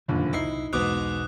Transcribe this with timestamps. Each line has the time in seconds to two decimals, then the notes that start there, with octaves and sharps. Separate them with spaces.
0.08 F1 A#1 F#2 D3 D#3
0.33 C2 D#4 E4 C7
0.73 B1 E2 G#2 B2 D6 D#6 F#6